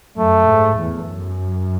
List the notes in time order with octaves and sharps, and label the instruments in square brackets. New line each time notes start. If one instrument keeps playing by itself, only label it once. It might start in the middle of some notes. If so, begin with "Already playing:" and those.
[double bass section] F#2 [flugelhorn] A3
[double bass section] G#2
E2
F#2